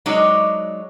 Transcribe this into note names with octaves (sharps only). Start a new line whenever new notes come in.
F#3 G#3 D4 D#4 C#5 D#5